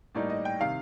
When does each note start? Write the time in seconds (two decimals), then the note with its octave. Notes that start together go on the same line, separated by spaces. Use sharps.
0.15 A2 G3 A#3 D#4 D5
0.30 D#5
0.45 G5
0.60 C3 D#3 F5